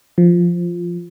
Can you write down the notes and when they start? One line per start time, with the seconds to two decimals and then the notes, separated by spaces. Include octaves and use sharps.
0.18 F3